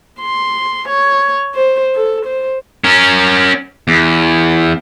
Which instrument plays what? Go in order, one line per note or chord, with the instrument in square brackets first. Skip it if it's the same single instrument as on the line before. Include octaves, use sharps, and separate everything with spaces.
[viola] C6
C#5
C5
A4
C5
[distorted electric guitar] C#4 A#4
E2